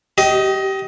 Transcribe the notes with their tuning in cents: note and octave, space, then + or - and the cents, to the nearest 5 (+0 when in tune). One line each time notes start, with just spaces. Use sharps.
G4 -20 D#5 +20